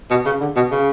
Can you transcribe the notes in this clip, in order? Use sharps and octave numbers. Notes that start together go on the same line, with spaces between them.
B2
C#3
D3
B2
C#3